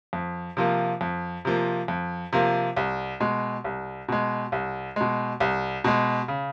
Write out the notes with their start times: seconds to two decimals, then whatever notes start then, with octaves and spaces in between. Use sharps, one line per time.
0.13 F2
0.57 C3 F3 A#3
1.01 F2
1.45 C3 F3 A#3
1.88 F2
2.33 C3 F3 A#3
2.76 C2
3.20 B2 G#3
3.64 C2
4.09 B2 G#3
4.52 C2
4.96 B2 G#3
5.40 C2
5.84 B2 G#3
6.28 C#3